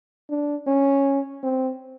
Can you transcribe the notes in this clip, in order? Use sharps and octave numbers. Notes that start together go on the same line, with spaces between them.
D4
C#4
C4